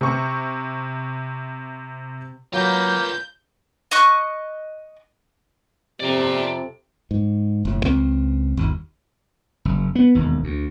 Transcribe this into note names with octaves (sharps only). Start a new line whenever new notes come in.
C3 C#6
F#3 A#3 F4 B4 A#5 G6
D#5 C#6 F#6
F2 C3 G4 D5 A#5
G#2
F#1 A2
C#2 C4
G1 D#2
F#1
B3
E1 D#2
D2